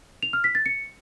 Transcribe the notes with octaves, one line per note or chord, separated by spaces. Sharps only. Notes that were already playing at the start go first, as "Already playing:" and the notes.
F7
F6
B6
A6
C#7